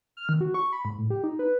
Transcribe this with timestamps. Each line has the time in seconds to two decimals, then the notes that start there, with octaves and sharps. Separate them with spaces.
0.17 F6
0.29 D#3
0.41 F#4
0.54 C#6
0.73 B5
0.85 G#2
0.98 A2
1.10 G4
1.24 D#4
1.39 B4